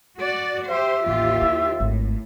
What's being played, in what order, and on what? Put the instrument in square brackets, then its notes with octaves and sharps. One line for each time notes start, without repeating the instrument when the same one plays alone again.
[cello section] F#4 D5
[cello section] G4 C5 [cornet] E5
[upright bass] A1 [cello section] D#2 F4 G4
[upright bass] E4
[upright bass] G#1 [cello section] A2